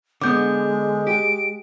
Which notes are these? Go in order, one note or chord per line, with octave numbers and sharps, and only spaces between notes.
D3 G#3 B3 D6 G6
G4 D7